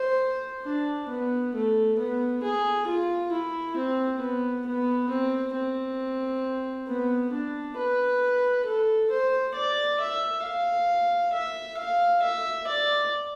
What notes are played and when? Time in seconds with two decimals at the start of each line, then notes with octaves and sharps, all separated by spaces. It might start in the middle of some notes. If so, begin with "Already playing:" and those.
Already playing: C5
0.64 D4
1.09 B3
1.54 A3
1.99 B3
2.43 G#4
2.87 F4
3.32 E4
3.76 C4
4.20 B3
4.66 B3
5.09 C4
5.54 C4
6.88 B3
7.33 D4
7.77 B4
8.66 A4
9.11 C5
9.55 D5
10.00 E5
10.44 F5
11.33 E5
11.77 F5
12.22 E5
12.67 D5